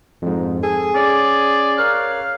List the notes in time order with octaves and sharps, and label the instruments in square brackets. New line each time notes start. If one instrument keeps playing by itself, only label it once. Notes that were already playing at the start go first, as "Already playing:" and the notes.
[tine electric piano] F2 G#2
[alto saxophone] G#4 [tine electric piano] A4
[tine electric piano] C#4 [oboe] D5
[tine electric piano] A#4 C#5 F#6 [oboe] F5